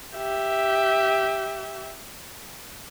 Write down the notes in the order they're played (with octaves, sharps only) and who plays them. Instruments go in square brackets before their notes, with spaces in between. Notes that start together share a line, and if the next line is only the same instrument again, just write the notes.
[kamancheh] G4 E5